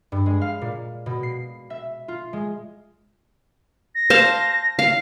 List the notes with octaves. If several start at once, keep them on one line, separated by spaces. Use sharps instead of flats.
G2
G#3
F5
A#2
B2
C7
E5
F4
G#3
A#6
C5 F5 A5
F5